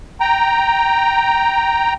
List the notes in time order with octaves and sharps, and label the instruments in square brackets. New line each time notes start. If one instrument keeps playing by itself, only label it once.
[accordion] G5 A#5